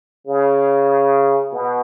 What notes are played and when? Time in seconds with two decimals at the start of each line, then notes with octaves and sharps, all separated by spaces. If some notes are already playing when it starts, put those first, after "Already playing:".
0.27 C#3
1.52 B2